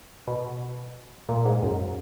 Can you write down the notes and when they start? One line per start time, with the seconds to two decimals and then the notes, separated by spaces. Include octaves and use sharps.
0.27 B2
1.29 A#2
1.45 G#2
1.63 F#2